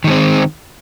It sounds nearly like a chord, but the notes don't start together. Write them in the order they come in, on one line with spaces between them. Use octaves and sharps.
D#3 G#3 C4